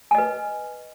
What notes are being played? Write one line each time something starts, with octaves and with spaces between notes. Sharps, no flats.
B4 D#5 G#5